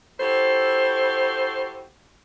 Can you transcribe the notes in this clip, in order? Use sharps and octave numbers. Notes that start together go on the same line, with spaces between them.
E4 F#4 G4 A4 C5